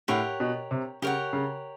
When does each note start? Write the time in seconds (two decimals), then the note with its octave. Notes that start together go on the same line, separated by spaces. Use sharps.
0.08 A2 G4 A#4 C#5 F#5
0.40 B2
0.71 C3
1.02 C#3 G4 A#4 C#5 F#5
1.33 C#3